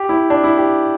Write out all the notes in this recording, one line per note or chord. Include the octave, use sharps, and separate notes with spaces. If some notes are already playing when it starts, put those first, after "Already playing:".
Already playing: G4
E4
D4
E4
G4